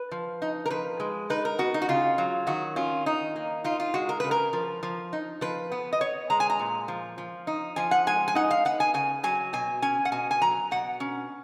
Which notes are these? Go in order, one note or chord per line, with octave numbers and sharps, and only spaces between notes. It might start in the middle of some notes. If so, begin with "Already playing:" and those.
Already playing: B4
F3
D#4
A#4
F3 B4
G#3
D#4 B4
A#4
B3 F#4
D#4
F#4
C#3 F4
F#3
D#3 F#4
C#4 F4
D#3 D#4
A#3
D#4 F4
F4
G#3 F#4
A#4
C#3 B4
A#4
F3
F3
D#4
F3 B4
B3
D#5
B3 C#5
G#3 A#5
G#5
A#5
A#2
F3
F3
D#4
F3 G#5
F#5
G#3 G#5
G#5
D#4 F#5
F5
B3 F#5
G#5
C#3 G#5
F#3 G#5
B2 G#5
C#4 G#5
F#5
B2 G#5
G#5
F#3 A#5
B2 F#5
C#4